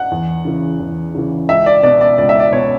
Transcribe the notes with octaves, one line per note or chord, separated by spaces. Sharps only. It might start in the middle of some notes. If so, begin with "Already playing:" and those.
Already playing: F#5
E2
C#3 E3
E2
C#3 E3
C#2 E5
D5
B2 D5
D5
C#2 D5
E5
D5
B2 C#5